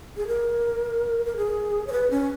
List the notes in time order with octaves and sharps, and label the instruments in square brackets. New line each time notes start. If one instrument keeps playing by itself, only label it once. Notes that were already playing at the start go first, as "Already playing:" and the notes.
[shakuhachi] G#4
A#4
A#4
G#4
C#5
B4
C#4